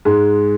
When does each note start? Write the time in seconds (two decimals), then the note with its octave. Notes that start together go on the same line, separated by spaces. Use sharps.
0.05 G#2 G#3